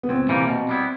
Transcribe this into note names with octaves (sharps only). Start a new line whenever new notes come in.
B3
C#2 C4
C3 E3 G3 A#3
B2
G3 B3 E4